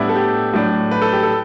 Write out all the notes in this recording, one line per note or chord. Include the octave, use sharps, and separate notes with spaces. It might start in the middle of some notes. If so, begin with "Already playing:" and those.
Already playing: A2 G3 B3 D4 E4
A4
G4
A2 F#3 A3 D4
B4
A4
G4
A4